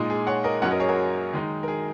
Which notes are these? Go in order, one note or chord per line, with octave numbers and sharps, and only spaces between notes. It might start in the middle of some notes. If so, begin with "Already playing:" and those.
Already playing: A#2 G#3 D#4
G#4
C#5 F#5
A#4 D#5
F#2 F#3 C#4 C#5 F#5
A#4 D#5
G#4 C#5
F#4 A#4
D#3 G#3 D#4
A#4
G#4